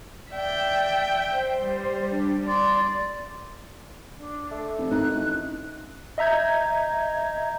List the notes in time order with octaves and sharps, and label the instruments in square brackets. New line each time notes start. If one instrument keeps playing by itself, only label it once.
[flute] D5 [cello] E5 G5
[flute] C5
[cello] G3
[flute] D4
[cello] D5 [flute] C6
[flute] D4
[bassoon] A3
[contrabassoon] F1
[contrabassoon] G#1 [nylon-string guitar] D#4 [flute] F#6
[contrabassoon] A1
[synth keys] D#5 E5 A#5 G6 G#6